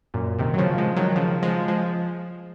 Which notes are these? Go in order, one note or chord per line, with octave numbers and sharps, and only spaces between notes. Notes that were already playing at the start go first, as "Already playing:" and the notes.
F#2 A#2
C3 D#3
F#3
C#3 F3
F3 G#3
D#3 F#3
C#3 F3
F3 G#3
F3 G#3